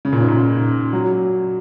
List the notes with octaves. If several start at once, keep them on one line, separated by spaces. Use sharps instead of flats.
C#3
A#2
G#2
A#2
F#3